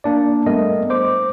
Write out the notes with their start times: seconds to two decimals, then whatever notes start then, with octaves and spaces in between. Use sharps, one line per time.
0.04 A#3 D4 D5
0.46 G3 A3 B3 A#4 D#5
0.90 C5 D6